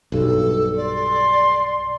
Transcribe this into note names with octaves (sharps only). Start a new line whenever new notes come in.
B1 G2 A4
D5 C6